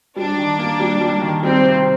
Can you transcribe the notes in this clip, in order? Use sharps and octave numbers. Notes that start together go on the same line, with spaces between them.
G3 D4
D#3
A#3
G3
G3
D#3
G3 C4
C3